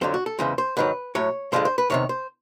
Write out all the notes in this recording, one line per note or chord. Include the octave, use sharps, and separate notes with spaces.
F2 D3 F#3 C5
F#4
A4
E2 C#3 E3 G#3 C5
C5
G#2 D#3 F#3 B4
A2 F#3 C#5
G2 D3 F3 G#3 C5
C5
B4
E2 C3 D#3 C#5
C5